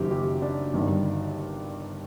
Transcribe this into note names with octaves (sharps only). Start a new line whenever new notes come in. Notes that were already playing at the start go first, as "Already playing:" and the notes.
Already playing: F#1 F#2 D#3 G4
G4
D4
G1 G2 D#3